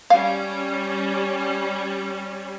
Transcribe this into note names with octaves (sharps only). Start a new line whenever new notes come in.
G3 C#4 F5